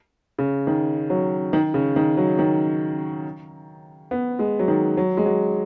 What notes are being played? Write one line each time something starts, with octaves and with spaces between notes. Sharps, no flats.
C#3
D#3
F#3
D#3
C#3
D#3
F#3
D#3
B3
G#3
F#3
D#3
F#3
G#3
F#3